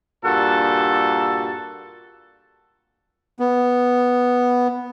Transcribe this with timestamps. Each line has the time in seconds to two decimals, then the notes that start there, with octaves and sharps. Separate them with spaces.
0.24 G2 A#2 F#4 A4
3.40 B3